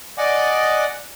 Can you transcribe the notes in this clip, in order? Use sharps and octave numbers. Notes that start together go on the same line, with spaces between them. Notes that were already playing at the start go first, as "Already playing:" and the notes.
D5 D#5 F#5 G#5 D6